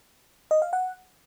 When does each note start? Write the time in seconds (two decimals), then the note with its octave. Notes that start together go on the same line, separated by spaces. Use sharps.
0.51 D#5
0.62 F5
0.73 F#5